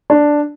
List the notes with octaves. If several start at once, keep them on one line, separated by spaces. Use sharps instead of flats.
D4